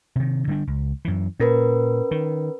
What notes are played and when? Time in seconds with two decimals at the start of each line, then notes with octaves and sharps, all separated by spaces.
0.16 C3 D#3
0.47 D3 G3 D4
0.67 C#2
1.05 F#2 E3
1.40 A#2 C#4 A#4 B4
2.11 D#3